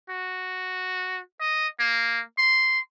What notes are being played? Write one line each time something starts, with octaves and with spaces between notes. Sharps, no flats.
F#4
D#5
A#3
C6